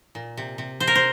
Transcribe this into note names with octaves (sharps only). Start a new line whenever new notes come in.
A#2
C3
C3
C3 C5
A#4
C5